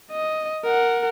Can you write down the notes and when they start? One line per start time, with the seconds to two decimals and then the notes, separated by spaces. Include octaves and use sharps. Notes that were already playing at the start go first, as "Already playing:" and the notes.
0.11 D#5
0.64 A#4 F#5